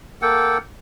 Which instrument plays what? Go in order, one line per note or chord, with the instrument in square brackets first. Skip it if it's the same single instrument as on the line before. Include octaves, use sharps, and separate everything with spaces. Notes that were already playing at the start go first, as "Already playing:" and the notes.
[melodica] A#3 A4 F#5 G5